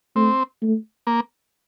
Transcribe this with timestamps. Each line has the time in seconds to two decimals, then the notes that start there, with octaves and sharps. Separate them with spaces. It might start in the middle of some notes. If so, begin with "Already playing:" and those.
0.15 A3 C4
0.62 A3
1.07 A#3